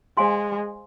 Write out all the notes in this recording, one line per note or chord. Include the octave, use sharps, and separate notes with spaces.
G#3 C5 F5 G#5 C6